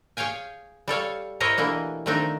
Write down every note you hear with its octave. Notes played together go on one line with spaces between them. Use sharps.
G#4 C#5 F5 G5 G#5
G3 A4 C#5 F5
E4 G4 A#4 C5 C#5 D#5
B2 E3 A3 A#3 D4
D#3 F3 A3 C4 D4 D#4